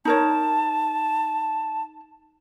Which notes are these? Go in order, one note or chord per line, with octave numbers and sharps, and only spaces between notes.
D#4 A#4 C#5 A5